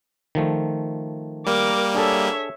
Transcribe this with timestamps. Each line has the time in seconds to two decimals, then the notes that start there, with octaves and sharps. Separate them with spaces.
0.35 D#3 F3 A3
1.46 G3 A#3 A#4 D6
1.95 D4 G#4 A4 C#5 E5